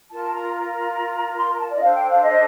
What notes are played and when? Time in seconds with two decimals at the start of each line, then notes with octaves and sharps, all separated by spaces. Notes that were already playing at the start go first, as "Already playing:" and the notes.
0.11 F4 A#4 A5
0.32 A#5
0.54 A#5
1.37 C6
1.48 A#5
1.58 A5
1.69 D5
1.75 D#5
1.79 D4 A4 C5 F5
1.94 G5
2.08 F5
2.22 D#5